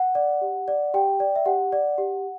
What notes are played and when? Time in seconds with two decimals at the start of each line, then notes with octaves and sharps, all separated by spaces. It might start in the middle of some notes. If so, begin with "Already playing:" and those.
Already playing: F#5
0.15 D5
0.41 G4
0.68 D5
0.94 G4 G5
1.20 D5
1.36 E5
1.45 G4 F#5
1.72 D5
1.98 G4